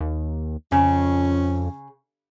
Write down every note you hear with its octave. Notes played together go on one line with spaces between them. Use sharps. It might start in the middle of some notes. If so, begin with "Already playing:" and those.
D#2
F2 C#3 C#4